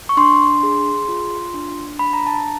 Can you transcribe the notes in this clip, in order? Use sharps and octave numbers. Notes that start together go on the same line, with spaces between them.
C#6
D4 C6
G#4
F4
D4
D4 B5
A#5
A5
A#5